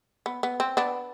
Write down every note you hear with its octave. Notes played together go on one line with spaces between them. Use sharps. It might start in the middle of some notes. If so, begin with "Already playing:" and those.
B3
B3
C4
B3 D4